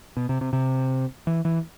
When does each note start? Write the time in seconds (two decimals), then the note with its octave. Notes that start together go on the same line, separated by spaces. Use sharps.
0.17 B2
0.29 C3
0.41 C3
0.53 C3
1.27 E3
1.45 E3